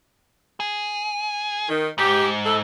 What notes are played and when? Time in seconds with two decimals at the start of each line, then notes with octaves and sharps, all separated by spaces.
0.60 G#4
1.69 D#3
1.98 G#2 G4
2.44 A4